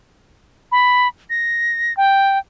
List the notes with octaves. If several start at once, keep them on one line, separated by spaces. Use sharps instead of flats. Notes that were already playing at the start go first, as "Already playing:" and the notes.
B5
A#6
G5